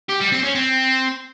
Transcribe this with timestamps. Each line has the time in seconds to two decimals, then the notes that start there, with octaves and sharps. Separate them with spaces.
0.09 G4
0.21 G3
0.32 C4
0.43 C#4
0.55 C4